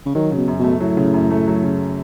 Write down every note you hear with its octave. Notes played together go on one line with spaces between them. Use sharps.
C#3
D#3 F#3
C#3
B2
F#2
B2 A3
A2 F#3
C#3
F#2
A3
F#3
C#3